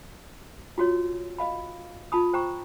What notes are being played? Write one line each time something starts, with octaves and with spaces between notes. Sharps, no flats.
F4 F#4 C#5
D#5 F5 B5
F4 A5 B5 D#6
C5 G5 A#5 C#6